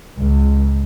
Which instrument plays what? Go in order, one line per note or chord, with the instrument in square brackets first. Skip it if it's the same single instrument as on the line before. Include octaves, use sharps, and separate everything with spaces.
[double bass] C#2